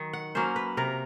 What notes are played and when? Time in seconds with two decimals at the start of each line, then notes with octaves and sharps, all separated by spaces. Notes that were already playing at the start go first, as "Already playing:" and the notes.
Already playing: D#3 F#3
0.13 F#5
0.35 F#3 A#3 C#4 C5
0.56 B4
0.77 C3 A#4